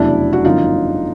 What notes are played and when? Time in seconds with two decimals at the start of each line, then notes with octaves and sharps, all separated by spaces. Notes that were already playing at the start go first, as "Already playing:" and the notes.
Already playing: F1 E2 C#3 F#3 D4 E4
0.33 F#4
0.44 G1 F#2 D3 F3 D#4 F4